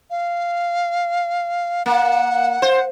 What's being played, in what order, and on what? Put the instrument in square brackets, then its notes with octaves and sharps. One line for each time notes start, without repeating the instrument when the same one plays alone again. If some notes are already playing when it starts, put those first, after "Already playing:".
[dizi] F5
[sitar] A#3 [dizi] F#5
[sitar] C5